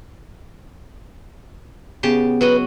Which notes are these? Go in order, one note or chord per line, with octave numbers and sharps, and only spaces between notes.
C#3 B3 G4 A5
F#3 F#4 B4 D#5